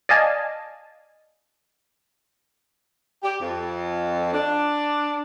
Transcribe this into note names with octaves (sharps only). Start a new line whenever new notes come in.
D5 D#5 F5 G#5 A5
G4
F2
D4